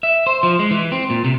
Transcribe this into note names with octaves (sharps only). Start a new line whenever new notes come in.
E5
C5
F3
G#3
E3
C4
A#2
C3